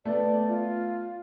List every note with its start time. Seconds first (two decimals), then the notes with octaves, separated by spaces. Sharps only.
0.05 A3 B3 D5
0.48 F4